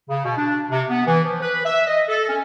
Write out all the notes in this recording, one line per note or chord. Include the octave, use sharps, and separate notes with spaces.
C#3
B2
D4
C3
B3
E3
F3
B4
E5
D#5
A4
C#4